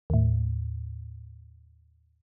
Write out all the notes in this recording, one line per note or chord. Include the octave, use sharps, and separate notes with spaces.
D#2 A2